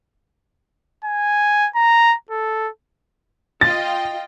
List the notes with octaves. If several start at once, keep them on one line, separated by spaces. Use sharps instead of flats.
G#5
A#5
A4
F4 D#5 G5 A6